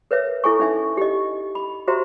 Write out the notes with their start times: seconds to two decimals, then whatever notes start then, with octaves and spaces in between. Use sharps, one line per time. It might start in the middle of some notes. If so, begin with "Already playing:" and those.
0.11 A#4 B4 C#5 E5
0.44 E4 A4 G#5 C#6
0.59 C#4 D#4 E5 G#5
0.97 G4 D#5
1.55 B5
1.88 F#4 G4 C5 E5 A#5 C6